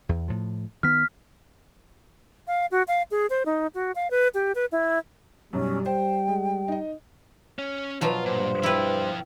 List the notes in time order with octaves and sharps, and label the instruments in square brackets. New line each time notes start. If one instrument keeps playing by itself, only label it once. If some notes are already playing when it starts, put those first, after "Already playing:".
[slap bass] E2
A2 F3
[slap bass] D#3 B3 [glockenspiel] F6 B6
[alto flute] F5
F#4
F5
G#4
C5
D#4
F#4
F5
B4
G4
B4
E4
[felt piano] B1 F#2 [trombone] G3 [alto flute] C#4
[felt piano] C5 [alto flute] G5
[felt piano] G#3
D#4 D#5
[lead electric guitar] C#4
[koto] B2 F3 F#3 [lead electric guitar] F4
[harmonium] G2 C5 [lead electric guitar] A#2
[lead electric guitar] F3 G5 [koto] E4 B4